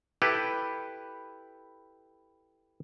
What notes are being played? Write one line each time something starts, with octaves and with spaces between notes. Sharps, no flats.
E4 G4 A4 B4